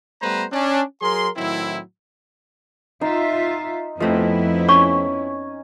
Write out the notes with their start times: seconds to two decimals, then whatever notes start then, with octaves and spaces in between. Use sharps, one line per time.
0.21 G3 A3 B3 B4 C5 A#5
0.52 C#4 D4
1.01 F#3 G#4 A#4 C6
1.37 A2 D#3 F#3 C4 E4
3.01 D#4 F4 E5
4.00 F2 F3 A3 B3 C4 E4 D#5
4.69 C#4 C#6